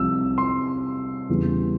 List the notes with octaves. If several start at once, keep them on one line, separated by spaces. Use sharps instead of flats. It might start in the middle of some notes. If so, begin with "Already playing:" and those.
Already playing: C2 C3 F3 E6
C6
E2 C#3 E3 G3